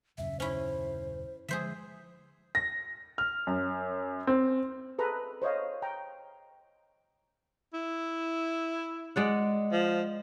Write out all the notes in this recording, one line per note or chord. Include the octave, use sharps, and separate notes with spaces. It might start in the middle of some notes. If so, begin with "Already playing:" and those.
D#1 F#2 C#3 E5
C#4 E4 C5
D3 F3 G#3 G#4 C5 E5
A#6
F6
F#2
C4
G#4 A4 B4 A#5
C5 C#5 D#5 F5
G5 A#5
E4
G#3 D5 F#5
F3